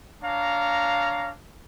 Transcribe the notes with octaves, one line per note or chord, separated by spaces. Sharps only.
D4 C#5 F5 A#5